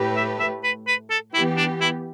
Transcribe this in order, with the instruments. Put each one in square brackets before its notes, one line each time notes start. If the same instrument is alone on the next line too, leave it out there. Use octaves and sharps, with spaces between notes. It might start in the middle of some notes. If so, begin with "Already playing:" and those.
Already playing: [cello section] A2 A3 G4 B4
[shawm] E5
E5
B4
B4
A4
[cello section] E3 B3 G4 B4 [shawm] E4
[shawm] D4
E4